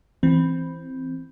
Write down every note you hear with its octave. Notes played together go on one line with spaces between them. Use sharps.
E3 C4